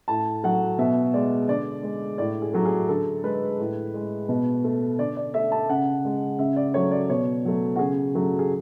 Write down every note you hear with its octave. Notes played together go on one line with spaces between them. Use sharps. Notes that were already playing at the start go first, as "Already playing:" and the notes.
A2 A5
F#3 A3 F#5
B2 E5
G#3 D5
D3 D5
G#3
A2 D5
G#4
F#3 A3
G#4
D3 A4
G#3 B4
A2
G#3
B2
A3
D3 D5
D5
A3 E5
A5
C#3 F#5
G#3
C#3 E5
D5
F#3 A3 C#5
D5
B2 C#5
F#3 A3
F#4
C#3 G#4
F#3 A3
G#4